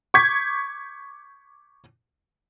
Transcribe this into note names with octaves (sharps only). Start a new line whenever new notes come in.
C#6 D6 G6 G#6 B6